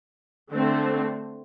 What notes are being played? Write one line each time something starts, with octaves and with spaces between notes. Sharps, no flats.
D3 A3 C4